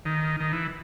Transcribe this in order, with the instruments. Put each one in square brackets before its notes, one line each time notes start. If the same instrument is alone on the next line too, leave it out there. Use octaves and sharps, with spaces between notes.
[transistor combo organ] D#3
D#3
E3